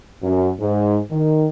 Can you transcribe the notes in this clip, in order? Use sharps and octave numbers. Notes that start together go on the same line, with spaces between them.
F#2
G#2
D#3